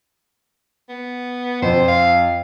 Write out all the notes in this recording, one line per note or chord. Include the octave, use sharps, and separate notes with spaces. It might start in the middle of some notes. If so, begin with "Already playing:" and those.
B3
F2 C5
F5